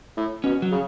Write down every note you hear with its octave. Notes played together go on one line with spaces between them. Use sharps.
A2
B2 C#4
F#3
C#3